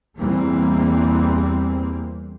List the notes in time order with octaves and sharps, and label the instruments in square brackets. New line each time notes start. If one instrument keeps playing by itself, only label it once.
[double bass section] E2 E3 G3 A#3 C4